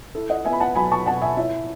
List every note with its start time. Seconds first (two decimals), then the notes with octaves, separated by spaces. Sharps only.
0.15 E4 A4
0.29 D#5 F#5
0.45 B3 E5 G#5
0.53 B5
0.60 F#5 A5
0.75 F#3 G#5 B5
0.92 A5 C#6
1.06 B2 F#5 A5
1.22 E5 G#5
1.37 E4 C#5 E5